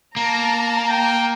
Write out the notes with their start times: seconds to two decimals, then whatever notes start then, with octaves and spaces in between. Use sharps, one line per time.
0.17 A#3 A5 A#5
0.90 G5